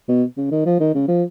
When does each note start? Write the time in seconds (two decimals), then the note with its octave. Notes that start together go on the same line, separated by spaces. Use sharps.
0.08 B2
0.37 C#3
0.51 D#3
0.66 F3
0.80 D#3
0.94 C#3
1.08 F3